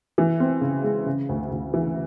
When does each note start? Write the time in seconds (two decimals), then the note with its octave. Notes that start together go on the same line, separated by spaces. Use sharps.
0.18 E3
0.40 C4
0.61 C#3
0.84 G#3
1.06 C#3
1.29 D2
1.51 D2
1.74 E3